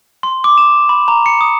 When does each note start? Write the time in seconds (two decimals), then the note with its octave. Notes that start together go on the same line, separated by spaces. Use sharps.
0.23 C6
0.44 D6
0.58 E7
0.89 B5
1.08 A#5
1.26 C#7
1.41 D#6